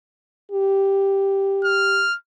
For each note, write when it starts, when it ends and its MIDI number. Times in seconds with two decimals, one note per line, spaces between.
0.52 2.05 67
1.65 2.15 89